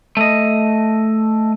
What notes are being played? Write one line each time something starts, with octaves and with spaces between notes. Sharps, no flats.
A3 D#5